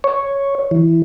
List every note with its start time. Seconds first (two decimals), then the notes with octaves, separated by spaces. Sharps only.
0.04 C#5
0.71 E3